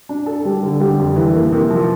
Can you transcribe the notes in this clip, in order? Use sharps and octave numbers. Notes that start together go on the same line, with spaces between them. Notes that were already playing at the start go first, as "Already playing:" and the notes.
D4
A4
G3
D3
G3
F2
E3
A#3
C3
F3